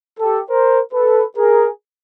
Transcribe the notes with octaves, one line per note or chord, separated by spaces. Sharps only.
G4 A4
A#4 C5
A4 B4
G#4 A#4